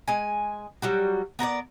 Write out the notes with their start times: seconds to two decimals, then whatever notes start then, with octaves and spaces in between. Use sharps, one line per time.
0.08 G#3 G#5
0.82 F#3 G3 F#4
1.39 B3 A#4 B4 D5